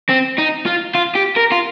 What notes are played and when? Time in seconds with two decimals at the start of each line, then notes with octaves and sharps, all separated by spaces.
0.09 C4
0.39 D#4
0.66 F4
0.95 F4
1.15 G4
1.36 A#4
1.52 F4